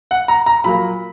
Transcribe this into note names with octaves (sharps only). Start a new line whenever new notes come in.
F#5
A#5
A#5
A#2 F#3 A#3 B5